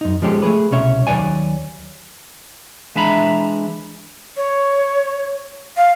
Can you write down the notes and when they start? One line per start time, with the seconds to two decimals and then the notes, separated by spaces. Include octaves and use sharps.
0.01 F#2 D#4
0.22 F3 G#3 C#4 G4 A4
0.42 A3 G#4 B4
0.71 C2 B2 C#4 C#5 E5
1.07 D#2 F#3 B4 C#5 D5 G#5
2.96 E3 G#3 D4 E5 A#5 B5
4.37 C#5
5.77 F5